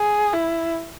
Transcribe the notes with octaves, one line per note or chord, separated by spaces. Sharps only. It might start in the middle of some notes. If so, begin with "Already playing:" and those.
Already playing: G#4
E4